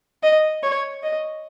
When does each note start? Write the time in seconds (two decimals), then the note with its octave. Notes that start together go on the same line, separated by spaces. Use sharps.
0.23 D#5
0.63 C#5
1.03 D#5